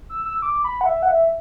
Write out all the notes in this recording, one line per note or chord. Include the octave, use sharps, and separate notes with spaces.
E6
E6
D6
B5
F#5
E5
F#5
E5